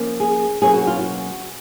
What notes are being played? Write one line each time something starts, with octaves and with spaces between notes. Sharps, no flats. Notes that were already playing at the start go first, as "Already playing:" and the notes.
Already playing: F3 A#3 C#4
G#4
B2 F#3 A#3 C#4 G#4
F#4
F4
F#4